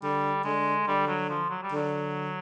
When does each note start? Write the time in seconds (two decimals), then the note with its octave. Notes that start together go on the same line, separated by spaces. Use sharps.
0.03 D3 G3
0.44 D3 G#3
0.87 D3 G3
1.08 F#3
1.29 F3
1.50 F#3
1.63 G3
1.72 D3 F#3